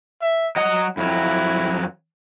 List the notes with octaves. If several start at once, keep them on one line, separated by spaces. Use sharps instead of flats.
E5
F#3 D#5 F#5
F2 F#3 E4